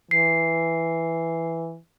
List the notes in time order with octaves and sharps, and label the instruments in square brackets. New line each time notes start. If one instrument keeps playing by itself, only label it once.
[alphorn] E3 [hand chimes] C7